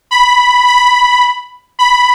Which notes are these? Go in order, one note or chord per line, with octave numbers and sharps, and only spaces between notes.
B5
B5
B5